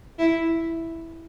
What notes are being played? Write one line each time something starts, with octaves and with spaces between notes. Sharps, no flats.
E4